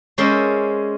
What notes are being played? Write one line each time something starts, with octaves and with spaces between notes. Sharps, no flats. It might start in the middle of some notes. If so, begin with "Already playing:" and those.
G#3 C#4 A#4 C5 D5 E5